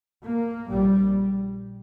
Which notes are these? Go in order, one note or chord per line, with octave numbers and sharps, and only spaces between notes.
A#3
A#1 A#2 G3